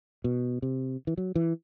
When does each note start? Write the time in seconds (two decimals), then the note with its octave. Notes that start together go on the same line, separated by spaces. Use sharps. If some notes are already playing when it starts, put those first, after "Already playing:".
0.24 B2
0.62 C3
1.07 E3
1.17 F#3
1.35 E3